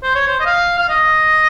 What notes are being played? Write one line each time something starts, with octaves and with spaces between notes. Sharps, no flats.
C5
C#5
C5
D#5
F5
F5
D#5